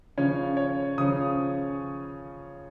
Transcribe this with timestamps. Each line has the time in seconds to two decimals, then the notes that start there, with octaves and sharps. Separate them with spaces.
0.18 C#3 F3 C#4 C#5
0.57 C#5
0.98 C#3 F3 C#4 D#6